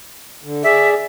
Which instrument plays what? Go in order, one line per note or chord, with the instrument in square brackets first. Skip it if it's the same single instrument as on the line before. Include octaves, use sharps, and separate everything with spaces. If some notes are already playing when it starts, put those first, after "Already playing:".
[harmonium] D3
[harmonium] G#4 D5 [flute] E5